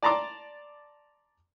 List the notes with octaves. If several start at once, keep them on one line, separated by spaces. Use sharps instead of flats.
D5 A5 A#5 C6 D6